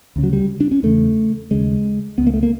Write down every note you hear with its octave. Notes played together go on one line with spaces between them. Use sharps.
D2 C#3
F#3
G3
D4
C#4
E2 C#3 A3
D#2 C#3 G#3
C#2 C#3 B3
A#3
A3
A#3